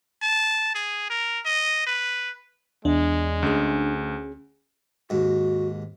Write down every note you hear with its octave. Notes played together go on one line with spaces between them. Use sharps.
A5
G#4
A#4
D#5
B4
E2 G#3 D4
D2 C#4 G#4
D#2 G#2 F#4